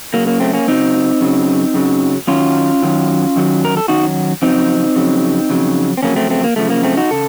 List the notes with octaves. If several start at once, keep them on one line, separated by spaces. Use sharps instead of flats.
F#2 C#3 F#3 A#3
A#3
A3 C4
A#3 C#4
F#2 C#3 F#3 C4 D#4
F#2 C#3 F#3
F#2 C#3 F#3
F#2 D#3 F#3 C#4 F4
F#2 D#3 F#3
F#2 D#3 F#3
A#4
A4
F#2 D#3 F#3 D#4 F#4
F2 C#3 F#3 C4 D#4
F2 C#3 F#3
F2 C#3 F#3
C4
F2 C#3 F#3 A#3 C#4
A3 C4
A3 C4
A#3
F#2 C#3 F3 A3
A#3
A3 C4
D#4 F#4
C#3 A4